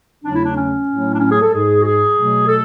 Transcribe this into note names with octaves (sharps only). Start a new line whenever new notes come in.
E2 C#3 F#3 A3 D4
E4
D4
C#4
A2 F#3 A3
D4
C#4
G#4
A4
G#2 G#3 G#4
F#4
G#4
B2 F#3 A3
A4